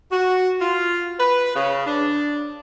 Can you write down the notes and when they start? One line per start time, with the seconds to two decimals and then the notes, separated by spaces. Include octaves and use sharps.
0.11 F#4
0.61 F4
1.19 B4
1.55 C#3
1.86 D4